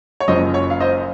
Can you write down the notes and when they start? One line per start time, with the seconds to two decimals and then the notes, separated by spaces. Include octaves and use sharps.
0.20 C#5
0.28 F#1 F#2 F3 C5 D#5
0.54 C#5
0.70 F5
0.80 C5 D#5